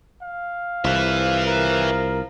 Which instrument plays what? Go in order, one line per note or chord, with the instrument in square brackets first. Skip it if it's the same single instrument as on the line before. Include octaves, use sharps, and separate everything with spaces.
[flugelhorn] F5
[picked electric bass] C2 [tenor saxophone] F3 [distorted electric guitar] B4 E5
[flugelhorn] A#4